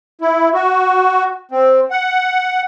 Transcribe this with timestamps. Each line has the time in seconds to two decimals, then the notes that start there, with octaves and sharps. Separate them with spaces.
0.21 E4
0.54 F#4
1.51 C4
1.91 F#5